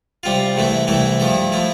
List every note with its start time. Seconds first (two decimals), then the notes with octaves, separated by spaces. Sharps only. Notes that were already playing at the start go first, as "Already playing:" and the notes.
0.23 C3 G3 C4 F4
0.56 C2 C3 E3 A3 E4
0.87 C2 C3 E3 A3 E4
1.20 G2 F3 A3 E4
1.52 F3 A3 E4